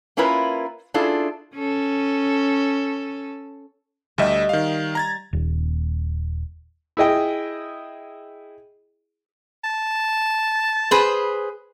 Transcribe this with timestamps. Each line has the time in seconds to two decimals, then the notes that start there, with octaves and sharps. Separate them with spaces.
0.17 A#3 C#4 E4 F4 A#4 B4
0.94 C#4 D4 E4 F4 G#4 A4
1.55 C#4 A4
4.18 D2 G3 D#5 E5 G5
4.49 D#3 F5
4.95 A#5 G#6 A6
5.33 D#1
6.97 E4 G#4 D#5 G5
9.64 A5
10.91 G#4 B4 C5